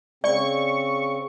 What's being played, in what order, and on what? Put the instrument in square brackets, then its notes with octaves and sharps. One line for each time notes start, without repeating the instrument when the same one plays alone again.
[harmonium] C#3 C4 [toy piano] D5 [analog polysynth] C#6